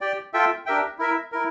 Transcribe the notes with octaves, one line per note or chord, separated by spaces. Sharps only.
G4 D5 G5
F4 A4 E5 G5
D4 G4 A#4 E5 G5
E4 A#4 E5
E4 A#4